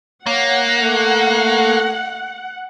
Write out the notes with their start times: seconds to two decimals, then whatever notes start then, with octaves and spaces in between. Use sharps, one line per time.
0.26 A#3 C#5 F#5
0.82 A3